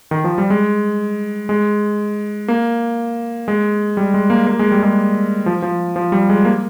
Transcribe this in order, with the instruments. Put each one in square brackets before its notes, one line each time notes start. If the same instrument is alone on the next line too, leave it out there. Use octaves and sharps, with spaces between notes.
[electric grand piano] D#3
F3
G3
G#3
G#3
A#3
G#3
G3
G#3
A#3
A#3
G#3
G3
G#3
F3
F3
F3
G3
G#3
A#3